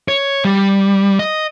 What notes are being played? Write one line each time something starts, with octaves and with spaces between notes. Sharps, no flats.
C#5
G3
D#5